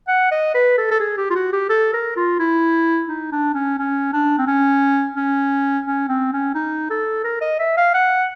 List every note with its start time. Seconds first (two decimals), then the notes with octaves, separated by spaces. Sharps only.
0.08 F#5
0.31 D#5
0.54 B4
0.78 A4
0.91 A4
1.00 G#4
1.17 G4
1.30 F4
1.35 F#4
1.53 G4
1.69 A4
1.93 A#4
2.17 F4
2.39 E4
3.09 D#4
3.32 D4
3.54 C#4
3.78 C#4
4.13 D4
4.38 C4
4.47 C#4
5.16 C#4
5.87 C#4
6.08 C4
6.33 C#4
6.55 D#4
6.90 A4
7.24 A#4
7.41 D#5
7.59 E5
7.77 F5
7.94 F#5